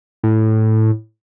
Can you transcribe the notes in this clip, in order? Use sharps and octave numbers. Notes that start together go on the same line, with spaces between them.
A2